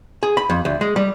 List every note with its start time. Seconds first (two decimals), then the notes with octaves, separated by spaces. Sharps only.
0.23 G#4
0.37 B5
0.50 F2
0.65 D2
0.81 G#3
0.96 G3